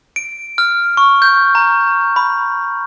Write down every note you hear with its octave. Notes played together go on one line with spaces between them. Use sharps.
D7
F6
C#6
G6
A#5
B5